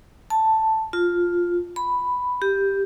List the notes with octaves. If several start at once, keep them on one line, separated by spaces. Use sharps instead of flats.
A5
F4
B5
G4